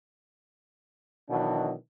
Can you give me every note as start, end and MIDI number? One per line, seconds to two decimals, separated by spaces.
1.29 1.73 47
1.29 1.73 51
1.29 1.73 52
1.29 1.73 54
1.29 1.73 62